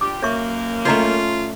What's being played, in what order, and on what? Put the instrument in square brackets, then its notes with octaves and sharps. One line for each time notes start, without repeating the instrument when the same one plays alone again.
[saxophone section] D4 F4 G4 [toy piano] D6
[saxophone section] F#2 A#3 [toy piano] C#5 E5 C#6
[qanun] A3 C#4 C6 [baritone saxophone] F4 [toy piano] C#5 D#5 A#5